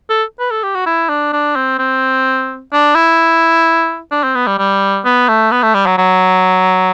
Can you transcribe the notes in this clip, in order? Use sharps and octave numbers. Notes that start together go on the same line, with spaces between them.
A4
B4
A4
G4
F#4
E4
D4
D4
C4
C4
D4
E4
D4
C4
B3
G3
G3
B3
A3
B3
A3
G3
F#3
F#3